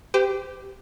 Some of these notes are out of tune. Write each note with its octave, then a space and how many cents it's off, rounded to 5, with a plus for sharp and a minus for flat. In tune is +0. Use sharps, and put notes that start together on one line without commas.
G4 +0 C5 -40